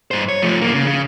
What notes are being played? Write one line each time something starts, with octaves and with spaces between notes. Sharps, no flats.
G2 C5
C#5
F3 A3
G2 A#3
C#3
C#3